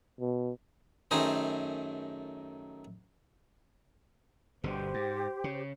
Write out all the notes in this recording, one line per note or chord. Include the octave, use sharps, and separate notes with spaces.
B2
F#2 D#3 A3 D#4 G#4 C5
G1 B2 D3 G4 C5
G#2
C#3